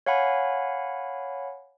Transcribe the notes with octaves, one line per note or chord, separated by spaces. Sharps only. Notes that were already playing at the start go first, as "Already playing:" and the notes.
C#5 F5 F#5 G#5 B5